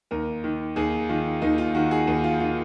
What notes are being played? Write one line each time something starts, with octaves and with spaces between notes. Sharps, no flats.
D#2 A#4
D#3
D#2 G#4
D#3 F4
D#2 D#4
F4
D#3 F#4
G#4
D#2
F4
D#3 F4